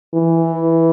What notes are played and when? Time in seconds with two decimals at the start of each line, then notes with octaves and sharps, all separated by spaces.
0.14 E3